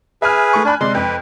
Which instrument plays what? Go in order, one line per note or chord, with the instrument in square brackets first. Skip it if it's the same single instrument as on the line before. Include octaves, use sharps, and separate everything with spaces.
[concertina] G#4 B4 [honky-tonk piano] E5 G#5 F6
[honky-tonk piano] A3 C#6
[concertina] D4 [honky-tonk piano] G#5 B5 F#6
[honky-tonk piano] C3 G#3 D5 [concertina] C6
[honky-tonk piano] F2 [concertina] B4